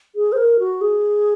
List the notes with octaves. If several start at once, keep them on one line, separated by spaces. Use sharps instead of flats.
G#4
C5
A#4
F#4
G#4